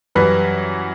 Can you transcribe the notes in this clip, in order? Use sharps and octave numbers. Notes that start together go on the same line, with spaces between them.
F#2 E3 G3 B4